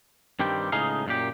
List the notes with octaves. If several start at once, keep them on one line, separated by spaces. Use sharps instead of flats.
G2 D#3 G3 C4 G4
C#2 A2 D#4 G#4 F5
F#2 A#2 G4